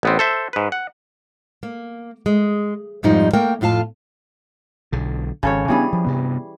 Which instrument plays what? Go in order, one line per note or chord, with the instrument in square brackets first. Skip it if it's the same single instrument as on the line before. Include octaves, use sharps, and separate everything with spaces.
[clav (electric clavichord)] A1 B3 C4
A4 C5 E5
G#2 B4
F#5
[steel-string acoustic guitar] A#3
G#3
F2 G#2 F3 G3 D#4
A3 A#3 A#4 G5
F2 A2 F4 F5 A5
[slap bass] B1 D3
[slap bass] G#1 [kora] C#3 A4 C#5
[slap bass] C#3 B3 D4 [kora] E3 G3 G#4
[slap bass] F3
G2 C3 B3